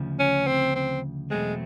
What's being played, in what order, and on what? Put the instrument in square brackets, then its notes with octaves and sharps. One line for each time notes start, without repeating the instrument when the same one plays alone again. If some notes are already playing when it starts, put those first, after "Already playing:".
Already playing: [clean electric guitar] D2 C#3 F3
[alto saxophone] C#4
C4
C4
[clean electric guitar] E2 B2 F#3 A3 C4 [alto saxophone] G#3